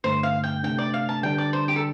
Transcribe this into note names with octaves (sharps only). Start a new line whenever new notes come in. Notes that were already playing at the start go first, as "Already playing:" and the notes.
G2 D3 A3 C5
F5
G5
C3 A3 D4 G5
D5
F5
A5
D3 G3 D4 G5
D5
C5
G4
A4